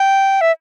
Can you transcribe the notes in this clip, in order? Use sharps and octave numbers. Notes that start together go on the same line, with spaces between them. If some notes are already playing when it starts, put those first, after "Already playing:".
Already playing: G5
E5